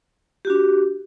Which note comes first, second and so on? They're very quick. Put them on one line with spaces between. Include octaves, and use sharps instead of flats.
G4 F#4 D4